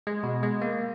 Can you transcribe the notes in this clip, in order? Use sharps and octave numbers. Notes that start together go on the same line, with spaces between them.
G#3
B2
G#3
A#3